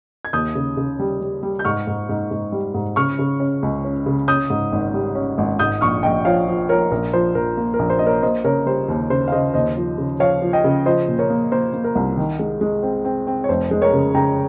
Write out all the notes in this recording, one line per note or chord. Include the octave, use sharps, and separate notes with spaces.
G#6
D#2 D#6 G6
C#3
C#3
G3
G3
G3
G6
G#2 C#6 F6
G#2
G#2
G#2
G3
G#2
C#3 C#6 F6
C#3
C#4
C#2
C#4
C#3
C#4 D#6 G6
G#2
G#1
G3
C#4
G#1
G#2 D#6 G6
A#1 C#6 F6
A#1 D#5 G5
F3 C#5 F5
F3
F3 A#4 C#5
A#1 A#4
F3 C5
A#1 A#4
A#3
A#4
A#1
C5
A#3 D#5
A#4 C#5
A#3 C5 D#5
C#3 A#4 C#5
G3 C5
D#2
C#3 C5
F5
C#3 C5 D#5
D#2 C5 D#5
F3
C#3
F3 C#5 F5
F3
D#5 G5
C#3
F3 C5 D#5
A#2
A#4 C#5
A#3
A#3 C5
A#3
A#4
C2
D#3
G#3
G#3
C4
C4
C4
C#5
F1 C5
G#3
A#4 C#5
C#3
C#3 G5 A#5